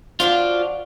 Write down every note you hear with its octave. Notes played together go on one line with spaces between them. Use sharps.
F3 D4 F4 F#4